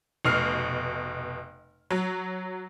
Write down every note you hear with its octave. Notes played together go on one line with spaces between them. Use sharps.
F1 B2 F6 C7
F#3